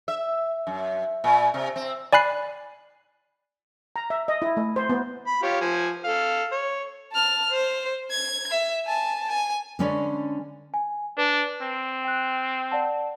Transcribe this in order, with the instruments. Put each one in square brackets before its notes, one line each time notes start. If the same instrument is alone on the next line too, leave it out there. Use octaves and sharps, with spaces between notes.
[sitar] E5
F#2
A#2
C3
C4
[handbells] D5 G#5 B5 F#6 C7
[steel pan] A#5
E5
D#5
E4
A3
C5
B3
[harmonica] B5
F4 G4 C#5
F3 G#5
A4 F5
C#5
[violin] A5 F6
C5
G#6
E5
G#5 A5
G#5
[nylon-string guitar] D3 G#3 C#4 B4 C#5 D5
[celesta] G#5
[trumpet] D4 [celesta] B4
[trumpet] C4
[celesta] G5 F#6
D5 F#5 A5